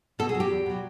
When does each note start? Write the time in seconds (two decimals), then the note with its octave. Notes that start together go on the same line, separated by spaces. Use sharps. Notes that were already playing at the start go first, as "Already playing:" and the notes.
0.19 B2 A4
0.29 G#4
0.34 F#3
0.40 G4
0.51 E2
0.66 B2 F#3